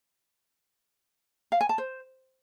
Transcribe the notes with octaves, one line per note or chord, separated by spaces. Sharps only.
F5
G#5
A5
C5